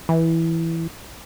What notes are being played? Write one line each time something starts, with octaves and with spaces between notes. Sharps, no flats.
E3